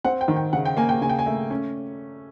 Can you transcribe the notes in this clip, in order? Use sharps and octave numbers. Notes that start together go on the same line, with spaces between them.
C4 F#5
G5
D#3
G5
C#3 F#5
G5
A#3 G#5
G5
C#3 G#5
G5
G#5
A3
C#4